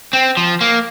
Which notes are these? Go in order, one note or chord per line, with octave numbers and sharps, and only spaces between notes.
C4
F3
A#3